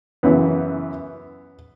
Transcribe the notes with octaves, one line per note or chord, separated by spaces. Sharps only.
F#2 C#3 E3 B3